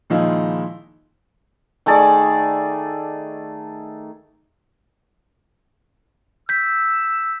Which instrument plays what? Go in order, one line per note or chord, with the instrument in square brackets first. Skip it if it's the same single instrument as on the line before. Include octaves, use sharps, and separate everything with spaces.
[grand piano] A#2 D#3 F3 G#3 D#4 E4
[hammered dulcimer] D#3 A3 G#4 D5
[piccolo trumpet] E6 [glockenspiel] G6 B6